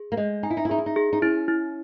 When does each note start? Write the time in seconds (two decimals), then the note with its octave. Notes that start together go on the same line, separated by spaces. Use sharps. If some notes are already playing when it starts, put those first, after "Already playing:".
Already playing: G#4
0.12 A#3
0.17 G#3 D#5
0.43 D#4 G#5
0.50 E4
0.57 D#4
0.65 E4
0.69 D#4 G#4
0.78 E4
0.86 D#4
0.96 G#4
1.13 D#4
1.22 C#4 E4
1.48 E4